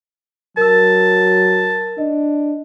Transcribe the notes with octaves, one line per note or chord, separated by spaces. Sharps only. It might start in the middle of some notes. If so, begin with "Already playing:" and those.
F#3 A#4 A5 E6
D4 D#5